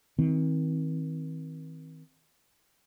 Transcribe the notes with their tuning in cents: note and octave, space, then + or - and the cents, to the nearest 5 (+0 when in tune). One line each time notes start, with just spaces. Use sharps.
D#3 +40 C4 +0